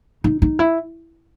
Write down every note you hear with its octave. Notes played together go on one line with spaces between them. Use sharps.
D#4
D#4
E4